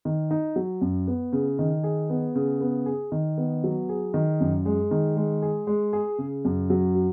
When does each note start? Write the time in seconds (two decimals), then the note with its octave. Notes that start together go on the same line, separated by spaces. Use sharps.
0.05 D#3
0.31 D#4
0.56 F#3
0.81 F#2
1.08 B3
1.33 C#3
1.59 D#3
1.84 G#4
2.10 B3
2.35 C#3
2.61 B3
2.86 G#4
3.12 D#3
3.38 B3
3.64 F#3
3.89 G#4
4.14 D#3
4.40 F#2
4.65 G#3
4.91 D#3
5.16 G#3
5.42 G#4
5.67 G#3
5.93 G#4
6.18 C#3
6.45 F#2
6.70 F#3
6.95 F#4